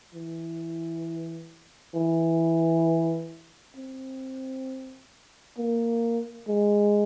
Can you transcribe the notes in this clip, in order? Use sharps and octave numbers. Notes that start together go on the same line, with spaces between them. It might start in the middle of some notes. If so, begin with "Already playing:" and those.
E3
E3
C4
A#3
G#3